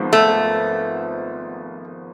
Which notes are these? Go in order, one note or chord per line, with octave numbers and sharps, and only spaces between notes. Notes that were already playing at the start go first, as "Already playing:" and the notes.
Already playing: G#1 G#2 F3 B3
A3